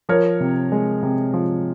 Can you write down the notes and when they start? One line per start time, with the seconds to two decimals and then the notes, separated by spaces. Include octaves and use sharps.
0.09 F3 A#4 C#5
0.40 C3
0.72 G#3
1.03 C3
1.33 F3